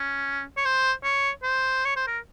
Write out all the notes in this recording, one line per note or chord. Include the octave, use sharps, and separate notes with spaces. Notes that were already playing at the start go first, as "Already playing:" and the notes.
Already playing: C#4
C#5
C5
C#5
C5
C#5
C5
A#4